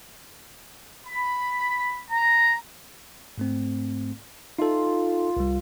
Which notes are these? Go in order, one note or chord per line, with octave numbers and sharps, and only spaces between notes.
B5
A#5
G#2 A3 C4
D#4 F4 A4
C2 G3